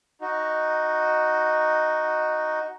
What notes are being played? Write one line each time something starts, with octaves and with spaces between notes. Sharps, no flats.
D#4 F#4